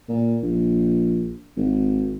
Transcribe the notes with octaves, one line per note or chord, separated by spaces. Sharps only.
A#2
A#1
G#1